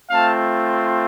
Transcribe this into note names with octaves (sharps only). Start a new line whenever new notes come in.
A3 C4 F4 F5 A5